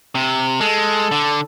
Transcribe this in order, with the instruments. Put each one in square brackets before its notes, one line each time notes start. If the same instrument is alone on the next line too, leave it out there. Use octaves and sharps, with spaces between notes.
[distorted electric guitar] C3
[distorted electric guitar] G#3 [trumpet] A4
[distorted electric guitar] D3